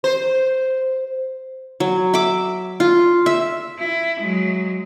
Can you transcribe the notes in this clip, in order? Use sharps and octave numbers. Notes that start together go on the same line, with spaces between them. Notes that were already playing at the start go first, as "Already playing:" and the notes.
C5
F#3
E5 D6
F4
E5
E4
F#3 G#3